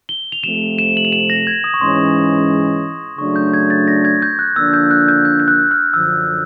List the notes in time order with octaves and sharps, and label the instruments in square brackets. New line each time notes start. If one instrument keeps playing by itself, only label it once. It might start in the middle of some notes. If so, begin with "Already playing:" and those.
[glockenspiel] G7
F7
[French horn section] C3 F3 A3 [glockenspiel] E7
[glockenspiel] E7
F#7
F7
E7
A#6
G#6
D#6
C#6
[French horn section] G#2 E3 G#3 C#4 [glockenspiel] C6
[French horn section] C#3 F#3 A3 D4 [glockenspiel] C#6
[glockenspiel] G6
G#6
A6
A#6
G#6
G6
F#6
[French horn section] D3 F3 A#3 D4 [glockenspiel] E6
[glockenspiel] G6
F#6
G6
G6
G6
F#6
F6
[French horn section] F#2 D3 F3 [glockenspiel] E6